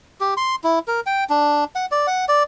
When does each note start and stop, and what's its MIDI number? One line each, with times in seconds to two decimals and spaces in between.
0.21 0.34 67
0.37 0.55 84
0.64 0.79 64
0.88 1.00 70
1.06 1.24 79
1.30 1.64 62
1.75 1.86 78
1.91 2.07 74
2.07 2.25 78
2.28 2.43 74